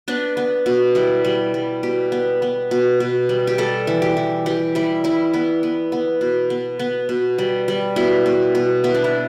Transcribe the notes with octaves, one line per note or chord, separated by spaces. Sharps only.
B3 D4
B3
B2
G3 E4
G3
G3
B2 G4
B3
B3
B2
B2
G3
G4
G3 A4
E3
G4
E3
E3 G4
G3 E4
G3 E4
B3 E4
B3
B3
B2
B3
B3
B2
G3
G3
B2 E4
B2
B2
B3 E4
D4
E4